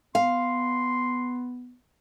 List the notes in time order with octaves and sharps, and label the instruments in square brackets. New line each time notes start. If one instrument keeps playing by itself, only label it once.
[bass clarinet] B3 [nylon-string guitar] F5 [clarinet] C6